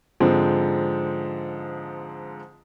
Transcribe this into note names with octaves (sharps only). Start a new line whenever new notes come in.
G#2 D3 F3 G#3 C4